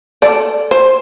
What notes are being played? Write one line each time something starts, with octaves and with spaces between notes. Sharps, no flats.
A4 D5
C5